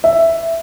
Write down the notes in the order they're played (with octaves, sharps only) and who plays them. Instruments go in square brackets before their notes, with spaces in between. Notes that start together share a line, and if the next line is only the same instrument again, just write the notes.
[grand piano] E5